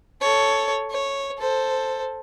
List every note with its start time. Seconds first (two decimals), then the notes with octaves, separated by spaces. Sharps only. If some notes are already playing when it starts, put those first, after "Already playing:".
0.21 A4 C#5
0.91 C#5
1.38 A4 C5